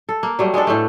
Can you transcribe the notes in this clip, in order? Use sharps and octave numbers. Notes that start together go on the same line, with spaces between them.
A4
A#3
F#3 G3 A3
G#3 B3 D4 A4
A2 A3